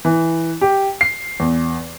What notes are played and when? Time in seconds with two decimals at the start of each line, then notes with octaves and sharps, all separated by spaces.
0.05 E3
0.61 G4
1.01 C7
1.40 E2